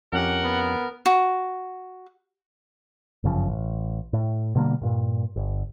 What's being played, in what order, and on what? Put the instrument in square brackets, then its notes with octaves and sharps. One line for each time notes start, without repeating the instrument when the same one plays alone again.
[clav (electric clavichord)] F2 C#4 G4 [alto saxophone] A#4 [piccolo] F#5
[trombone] B3
[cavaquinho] F#4
[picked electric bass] G1 F#2 C#3 F3
A1
A2
B2 D3 G3 A#3
G2 A#2
G1